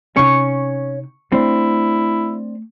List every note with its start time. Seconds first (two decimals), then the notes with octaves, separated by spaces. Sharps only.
0.16 C3 C#4 D#4 C#6
1.32 A3 C4 D4 E4